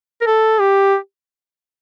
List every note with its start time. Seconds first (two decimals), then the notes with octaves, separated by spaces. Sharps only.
0.21 A#4
0.27 A4
0.60 G4